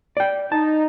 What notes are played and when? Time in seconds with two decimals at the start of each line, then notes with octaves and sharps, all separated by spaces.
0.17 D5 G5
0.52 D#4 A5